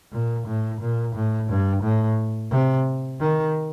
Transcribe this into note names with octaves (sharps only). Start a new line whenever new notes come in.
A#2
A2
A#2
A2
G2
A2
C3
D#3